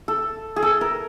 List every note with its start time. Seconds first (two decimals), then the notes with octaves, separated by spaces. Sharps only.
0.08 A4
0.56 G#4
0.62 A4
0.81 A#4